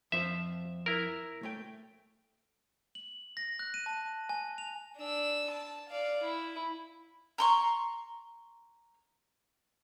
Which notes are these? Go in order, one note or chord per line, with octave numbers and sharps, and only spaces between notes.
F2 F3 C5 E5
E4 A#4
A3 C#5 G5
F#7
A#6
F#6
D#7
A5
G#5
F7
D4 E6
A5
D5 F5
E4
A#5 C6 C#6